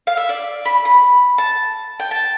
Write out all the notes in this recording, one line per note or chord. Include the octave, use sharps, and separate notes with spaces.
F5
E5
D5
B5
B5
A5
G5
A5